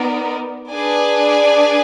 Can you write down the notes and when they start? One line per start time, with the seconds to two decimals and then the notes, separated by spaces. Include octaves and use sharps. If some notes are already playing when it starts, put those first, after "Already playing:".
Already playing: B3 D#4 A#4 D5
0.72 D4 G#4 B4 D5 G#5